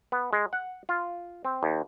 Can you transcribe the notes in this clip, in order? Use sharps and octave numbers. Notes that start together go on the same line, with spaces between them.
B3
G#3
F#5
F4
C4
D#2